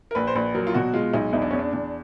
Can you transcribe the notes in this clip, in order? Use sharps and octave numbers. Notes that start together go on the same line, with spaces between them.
A#4
A#1 B4
C5
A#1 B4
F#3 A#4
F4
B2 F#4
G#3 F4
B1 D#4
E2 D#4
D4
E2 C#4
D4
E2